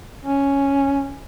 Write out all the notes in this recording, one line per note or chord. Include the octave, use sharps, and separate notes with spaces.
C#4